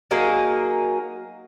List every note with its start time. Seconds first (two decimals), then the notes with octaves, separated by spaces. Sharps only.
0.11 F#3 A#3 D#4 G#4